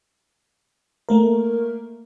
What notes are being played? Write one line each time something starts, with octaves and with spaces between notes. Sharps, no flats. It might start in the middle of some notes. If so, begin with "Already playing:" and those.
A3 A#3 A#4